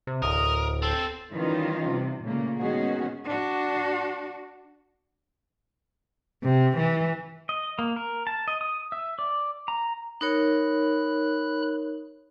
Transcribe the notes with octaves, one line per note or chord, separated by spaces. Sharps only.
C3
D1 A#4 D#6
C4 A4
D#3 E3 G3 C#4 D#4 F4
C3
A#2 C#3 A3 A#3
D#3 G#3 B3 C#4 F#4 G#4
D4 F#4
C3
E3
D#5
A#3
A#4
A5
D#5
D#6
E5
D5
A#5
D#4 A#4 C#5 B5 F#6